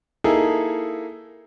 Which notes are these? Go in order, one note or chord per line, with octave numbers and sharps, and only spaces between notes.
A#3 D#4 E4 G#4 A4